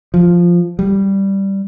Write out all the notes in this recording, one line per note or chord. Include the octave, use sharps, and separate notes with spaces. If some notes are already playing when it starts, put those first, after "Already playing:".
F3
G3